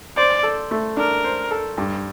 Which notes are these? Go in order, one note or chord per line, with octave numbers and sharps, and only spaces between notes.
C5 D5
A4
A3
D4 A#4
C5
A4
G2